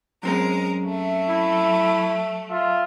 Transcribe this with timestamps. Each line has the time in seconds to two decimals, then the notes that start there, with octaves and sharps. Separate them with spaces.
0.23 F#2 G#3 C4 A#4
0.85 F#3 A3 E5
1.29 E4
2.50 F4 E5